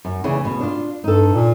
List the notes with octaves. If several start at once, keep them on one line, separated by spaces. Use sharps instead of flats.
F#2
D2 C#3 E3
B2
D4 F4
G2 D#4 A4
A#2